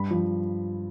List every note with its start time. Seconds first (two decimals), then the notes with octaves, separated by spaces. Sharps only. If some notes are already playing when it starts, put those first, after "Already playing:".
Already playing: G2 B5
0.11 F3